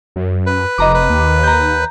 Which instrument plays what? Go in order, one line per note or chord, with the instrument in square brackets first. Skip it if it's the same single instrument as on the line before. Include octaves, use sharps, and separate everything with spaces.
[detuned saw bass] F#2
[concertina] B4
[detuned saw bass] F1 [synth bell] D#5 A#5 D6
[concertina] B4
[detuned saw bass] D#2
[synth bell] A#5 G6